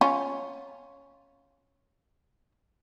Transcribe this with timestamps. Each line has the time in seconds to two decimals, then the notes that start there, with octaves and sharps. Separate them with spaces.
0.01 C#4 F4